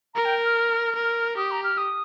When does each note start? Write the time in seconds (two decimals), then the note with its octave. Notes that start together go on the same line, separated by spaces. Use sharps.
0.14 A#4 A#5
0.25 G5
0.45 F6
0.96 A#4
1.37 G4 D#6
1.51 A#5
1.64 F6
1.78 D#6